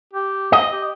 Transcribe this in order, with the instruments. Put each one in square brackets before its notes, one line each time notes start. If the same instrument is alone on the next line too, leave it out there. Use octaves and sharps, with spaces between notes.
[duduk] G4
[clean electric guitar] D#5
[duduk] G4